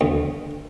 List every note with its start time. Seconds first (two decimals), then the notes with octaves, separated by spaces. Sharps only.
0.01 D2